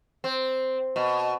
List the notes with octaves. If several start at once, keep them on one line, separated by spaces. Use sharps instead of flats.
C4
B2